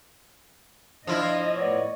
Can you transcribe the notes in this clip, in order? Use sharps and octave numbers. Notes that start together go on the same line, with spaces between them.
F3 D4 E4 F4 D#5
A2 B3 C#5 D5